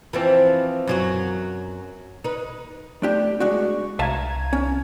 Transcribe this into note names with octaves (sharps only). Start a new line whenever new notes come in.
E3 F3 C4
F#2 F#3 F#4
D#4 B4
A3 D4 G4
G#3 D4 F#4 C#6
C2 E5 F5 A5 A#5 G#6
C#4